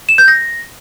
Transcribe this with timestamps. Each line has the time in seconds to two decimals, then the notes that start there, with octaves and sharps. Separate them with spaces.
0.09 E7
0.18 G6
0.28 A#6